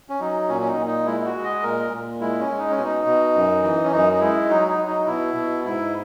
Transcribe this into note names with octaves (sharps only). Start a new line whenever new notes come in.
C#4
F#3 D#4
A#2 C#4
C#4
D#4
A#2
D#4
G#3 E4
E4
F#4
G#3
D#5
A#2 A#4
A#2
G#3 E4
C#4
G#3
D#4
C#4
B2
D#4
B2
F#2
E3
C#4
F#2 D#4
D#4
G#3 E4
F#3 D#4
D#4
F#3
D#4
B2 E4
B2
G#2 E4